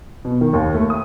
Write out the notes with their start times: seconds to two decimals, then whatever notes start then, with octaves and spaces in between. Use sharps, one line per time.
0.25 B2
0.41 D#3
0.53 D#2
0.75 A3
0.90 D#6